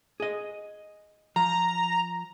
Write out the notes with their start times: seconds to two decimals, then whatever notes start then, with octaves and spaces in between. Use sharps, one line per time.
0.20 G#4 D#5
1.36 F3 A#5